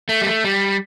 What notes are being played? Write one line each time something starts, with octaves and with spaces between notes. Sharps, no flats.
A3
G3
A3
G3